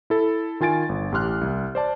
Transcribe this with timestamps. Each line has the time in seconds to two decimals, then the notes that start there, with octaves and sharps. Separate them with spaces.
0.10 E4 A4
0.60 D#3 F4 G#5 A6 D7
0.89 G1
1.12 A1 G4 C6 F6 F#6
1.41 C2
1.75 C5 D5 A5